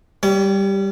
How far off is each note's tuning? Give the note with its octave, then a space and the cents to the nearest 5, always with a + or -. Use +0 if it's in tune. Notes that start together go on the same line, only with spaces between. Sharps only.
G3 +0 C#5 +40